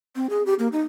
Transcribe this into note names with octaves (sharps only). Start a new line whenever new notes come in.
C4
G#4
G4
A#3
D#4